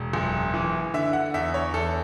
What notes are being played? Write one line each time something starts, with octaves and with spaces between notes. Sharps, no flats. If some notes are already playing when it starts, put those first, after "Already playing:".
Already playing: E1
F#1
E3
D3 E5
F#5
E2 E5
C#5
E2 A4